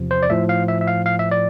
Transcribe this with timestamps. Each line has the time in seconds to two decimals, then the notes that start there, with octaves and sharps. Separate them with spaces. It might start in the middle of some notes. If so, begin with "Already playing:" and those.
Already playing: E2 C3 F3
0.11 C5
0.23 D5
0.30 A2 F3 E5
0.49 F5
0.68 E5
0.81 E5
0.88 F5
1.06 F5
1.19 E5
1.31 D5